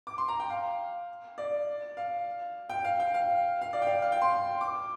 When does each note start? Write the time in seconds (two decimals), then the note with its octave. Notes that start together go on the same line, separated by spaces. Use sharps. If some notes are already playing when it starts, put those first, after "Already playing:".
0.07 D6
0.18 C6
0.28 A#5
0.40 G5
0.50 F5
1.38 D5
1.97 F5
2.70 G5
2.85 F5
3.00 G5
3.14 F5
3.62 F5
3.73 D5
3.82 G5
3.87 F5
4.02 F5
4.12 G5
4.22 C6
4.61 D6